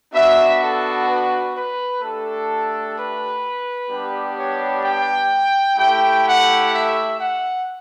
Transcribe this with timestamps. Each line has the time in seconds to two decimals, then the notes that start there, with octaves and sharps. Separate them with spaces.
0.14 B3 D4 F#4 E5
0.61 A4
1.08 B4
1.55 B4
2.02 A3 D4 G4 A4
2.96 B4
3.90 G3 B3 D4 G4
4.37 C#5
4.84 G5
5.78 A3 E4 G4 G5
6.25 F#5
6.72 E5
7.19 F#5